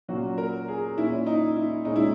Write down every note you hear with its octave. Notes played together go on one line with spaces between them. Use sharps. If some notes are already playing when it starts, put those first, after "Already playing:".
A#2 F#3 A#3 C#4 F#4
A#4
G#4
A#2 A#3 C#4 E4
D#4
E4
A#2 G#3 C#4 D#4
E4